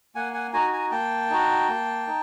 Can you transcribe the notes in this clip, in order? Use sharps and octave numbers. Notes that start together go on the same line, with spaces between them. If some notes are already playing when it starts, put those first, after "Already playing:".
A#3 F#5 G#5
F#5 G#5
D#4 F#4 G#5 A#5
G#5 A#5
A#3 G5 A5
D#4 F#4
A#3
D#4